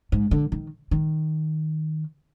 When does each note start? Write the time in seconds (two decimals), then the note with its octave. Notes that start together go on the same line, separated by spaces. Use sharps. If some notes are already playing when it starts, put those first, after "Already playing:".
0.12 G#2
0.31 D3
0.52 D#3
0.91 D#3